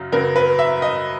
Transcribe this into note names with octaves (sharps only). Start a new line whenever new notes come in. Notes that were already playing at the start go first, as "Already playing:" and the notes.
Already playing: F#2 C#3 F#3
F#2 C#3 F#3 B3 A#4
B4
E5
D#5